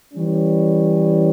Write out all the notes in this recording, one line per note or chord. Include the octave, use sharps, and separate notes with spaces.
E3 G3 C#4